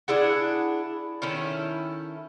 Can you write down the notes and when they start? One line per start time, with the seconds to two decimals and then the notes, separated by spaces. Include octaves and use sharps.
0.08 D4 E4 G#4 F#5
1.22 D#3 C#4 E4 A4